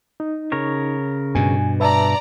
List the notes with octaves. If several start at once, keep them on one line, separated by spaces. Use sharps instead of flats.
D#4
C#3 A#4 C#5
G2 B2 G#5
B4 D5 E5 A5 A#5